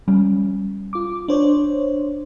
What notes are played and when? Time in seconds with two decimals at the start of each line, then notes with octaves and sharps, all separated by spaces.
0.08 G3 C#4
0.93 F4 D6
1.28 D4 C5 C#5